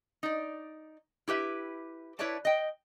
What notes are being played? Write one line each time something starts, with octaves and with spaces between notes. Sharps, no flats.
D#4 D5
E4 G4 B4 E5
E4 B4 C#5 D5 E5 A5
D#5 G5